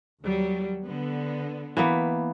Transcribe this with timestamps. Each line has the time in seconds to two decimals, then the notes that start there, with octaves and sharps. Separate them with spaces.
0.22 D#2 F#3 G3
0.85 D3 B3
1.77 E3 A#3 B3